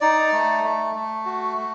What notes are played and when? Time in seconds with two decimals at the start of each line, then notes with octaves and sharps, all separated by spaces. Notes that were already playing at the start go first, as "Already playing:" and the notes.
0.01 D#4 D5
0.32 A3
0.64 A3
0.95 A3
1.25 F#4
1.57 A3